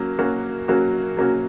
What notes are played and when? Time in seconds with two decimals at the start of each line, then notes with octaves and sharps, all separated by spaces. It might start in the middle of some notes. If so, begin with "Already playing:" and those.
Already playing: F#3 A#3 C#4
0.19 F#3 A#3 C#4 F#4
0.68 F#3 A#3 C#4 F#4
1.17 F#3 A#3 C#4 F#4